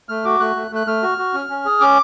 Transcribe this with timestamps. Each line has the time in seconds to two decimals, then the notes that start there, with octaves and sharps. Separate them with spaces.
0.09 A3 F6
0.25 F#4 D6
0.40 A3 F#6
0.56 A3
0.71 A3 F#6
0.87 A3 F6
1.02 F#4
1.18 F#4
1.34 C#4
1.50 C#4
1.65 G#4
1.81 C#4 D6